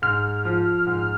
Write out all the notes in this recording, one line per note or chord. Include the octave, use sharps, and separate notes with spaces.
G#2 F6
F3
G#2